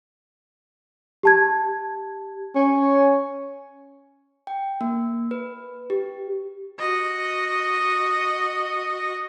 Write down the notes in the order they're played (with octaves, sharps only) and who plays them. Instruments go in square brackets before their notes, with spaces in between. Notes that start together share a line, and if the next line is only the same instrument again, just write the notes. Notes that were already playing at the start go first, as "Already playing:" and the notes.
[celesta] G4 A5 G#6
[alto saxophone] C#4
[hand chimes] G5
A#3
B4
G4
[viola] F#4 D#5